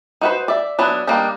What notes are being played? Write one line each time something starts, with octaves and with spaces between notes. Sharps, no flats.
D#4 F#4 A4 B4 C5
D5 E5
F#3 B3 D4 E4
G3 A#3 D4 D#4